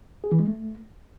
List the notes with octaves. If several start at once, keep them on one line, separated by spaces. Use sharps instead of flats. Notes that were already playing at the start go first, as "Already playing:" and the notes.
G#4
E3
G#3
A3